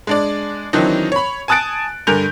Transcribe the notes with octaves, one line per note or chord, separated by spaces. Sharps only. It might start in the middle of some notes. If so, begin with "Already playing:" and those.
G#3 D4 D5
D#3 E3 F#3 C4 D4 D#4
C#5 B5
G#5 A5 D#6 F#6 A6 D7
G2 D3 A#4 G#5 G6 F7